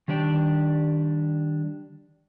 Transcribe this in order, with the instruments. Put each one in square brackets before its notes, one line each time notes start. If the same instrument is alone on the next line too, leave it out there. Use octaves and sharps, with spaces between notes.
[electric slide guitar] D#3 G3 D4 D5 G5